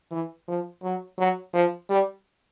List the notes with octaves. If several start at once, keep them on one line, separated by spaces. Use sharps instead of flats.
E3
F3
F#3
F#3
F3
G3